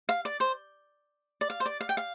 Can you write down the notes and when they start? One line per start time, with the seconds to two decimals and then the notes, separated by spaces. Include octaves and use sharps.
0.09 F5
0.25 D5
0.40 C5
1.41 D5
1.50 F5
1.60 C5
1.66 D5
1.81 F5
1.89 G5
1.97 F5